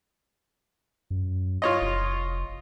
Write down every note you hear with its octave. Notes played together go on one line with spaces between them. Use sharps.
F#2
F4 C#5 D#5
F1